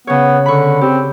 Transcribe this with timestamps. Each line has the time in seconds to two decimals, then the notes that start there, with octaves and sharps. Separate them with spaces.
0.07 C#3 B3 C#5
0.46 D3 B5 C#6
0.81 C4 G4